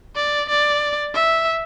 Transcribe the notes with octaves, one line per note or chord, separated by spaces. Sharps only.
D5
D5
E5